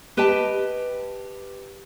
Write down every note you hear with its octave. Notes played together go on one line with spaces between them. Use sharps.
G4 B4 D#5 G5 A5